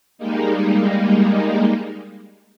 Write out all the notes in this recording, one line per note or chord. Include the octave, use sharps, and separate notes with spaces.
G3 G#3 A#3 D#4